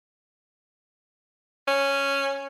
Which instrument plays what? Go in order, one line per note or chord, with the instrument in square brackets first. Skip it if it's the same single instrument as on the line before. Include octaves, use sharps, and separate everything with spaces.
[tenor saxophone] C#4